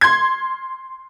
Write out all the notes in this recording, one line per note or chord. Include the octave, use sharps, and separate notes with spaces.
C6 G#6